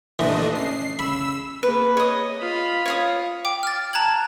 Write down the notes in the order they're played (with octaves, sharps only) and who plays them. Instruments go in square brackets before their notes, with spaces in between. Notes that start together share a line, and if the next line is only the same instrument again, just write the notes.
[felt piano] A#2 D#4 G4 [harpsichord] E3 [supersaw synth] A3 D4 D#5
[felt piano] C#4 [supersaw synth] C7
[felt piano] C#3 [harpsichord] B5 [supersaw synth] E6
[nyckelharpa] A#3 G#4 [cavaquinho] B4
[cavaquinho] C#5 D#6 [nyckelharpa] D#5
[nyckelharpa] F4 B5
[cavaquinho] C#5 F5 D#6
[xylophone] G5 D6
F6 A6
A5 A#5 F#6 G#6 F#7